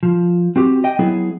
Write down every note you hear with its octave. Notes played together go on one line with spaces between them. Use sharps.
F3
C4 F#4 G4
D#5 G5
F#3 B3 E4 G#4